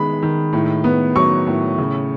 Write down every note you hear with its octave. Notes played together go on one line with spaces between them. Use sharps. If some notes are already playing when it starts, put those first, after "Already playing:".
Already playing: D#3 G#3 B3 B5
D#3
A2
B3
F#3 C#6
A2
C#3